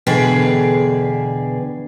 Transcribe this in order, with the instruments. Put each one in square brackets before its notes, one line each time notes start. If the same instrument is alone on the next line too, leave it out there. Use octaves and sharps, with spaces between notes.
[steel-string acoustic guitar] E2 B2 D3 G#4 B4 G5